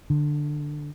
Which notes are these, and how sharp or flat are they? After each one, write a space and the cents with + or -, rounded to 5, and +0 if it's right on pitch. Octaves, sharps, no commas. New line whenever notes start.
D3 +10